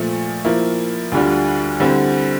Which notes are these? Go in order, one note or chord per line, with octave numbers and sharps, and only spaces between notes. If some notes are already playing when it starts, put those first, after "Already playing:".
Already playing: A#2 F3 A3
F3 A#3 E4
D2 D3 G3 D4 F4
D3 G3 C4 E4